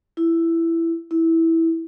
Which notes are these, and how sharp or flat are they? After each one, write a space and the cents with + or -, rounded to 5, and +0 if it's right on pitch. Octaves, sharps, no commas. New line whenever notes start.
E4 +10
E4 -10